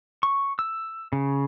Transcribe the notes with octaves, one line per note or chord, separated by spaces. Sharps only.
C#6
E6
C#3